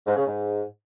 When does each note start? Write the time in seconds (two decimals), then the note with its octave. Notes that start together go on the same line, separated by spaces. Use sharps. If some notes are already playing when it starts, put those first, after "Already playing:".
0.06 G#2
0.16 C#3
0.26 G#2